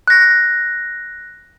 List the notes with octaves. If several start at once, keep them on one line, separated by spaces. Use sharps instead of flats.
F#6 A#6